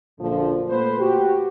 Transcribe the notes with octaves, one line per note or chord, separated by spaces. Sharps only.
A#1 F#2 D3 F3
A#2 A3 B3 B4 C5
F#4 G4